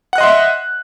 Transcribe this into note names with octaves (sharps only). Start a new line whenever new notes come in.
D#5 E5 F#5 C6 F#6